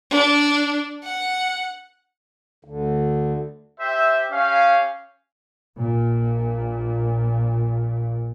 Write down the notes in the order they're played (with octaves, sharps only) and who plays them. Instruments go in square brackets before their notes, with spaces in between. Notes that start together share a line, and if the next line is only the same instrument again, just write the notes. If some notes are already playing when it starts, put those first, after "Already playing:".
[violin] D4
F#5
[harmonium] D2 D3
[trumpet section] G4 C5 E5
C#4 G4 F5
[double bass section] A#1 A#2